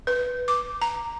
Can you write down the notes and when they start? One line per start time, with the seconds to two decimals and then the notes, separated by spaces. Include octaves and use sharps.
0.07 B4
0.48 D6
0.82 A#5